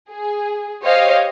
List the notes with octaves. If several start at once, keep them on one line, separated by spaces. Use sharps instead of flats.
G#4
G4 C5 C#5 D#5 F5